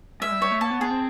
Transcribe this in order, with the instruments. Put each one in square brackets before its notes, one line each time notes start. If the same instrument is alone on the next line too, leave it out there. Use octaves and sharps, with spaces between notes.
[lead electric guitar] G#3 [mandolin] E5
[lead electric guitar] G3
[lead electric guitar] G3 [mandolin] C#5
[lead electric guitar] A3
[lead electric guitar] A#3 [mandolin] A5
[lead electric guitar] B3
[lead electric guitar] B3 [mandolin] G#4
[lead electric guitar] C4